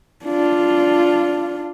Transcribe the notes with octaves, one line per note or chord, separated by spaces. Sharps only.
D4 F4